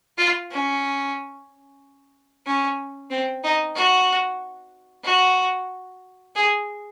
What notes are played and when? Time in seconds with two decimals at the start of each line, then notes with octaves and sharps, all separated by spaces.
0.18 F4
0.51 C#4
2.46 C#4
3.10 C4
3.43 D#4
3.75 F#4
5.04 F#4
6.35 G#4